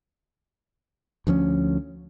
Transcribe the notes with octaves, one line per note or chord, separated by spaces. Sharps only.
D2 F3 A#3 C#4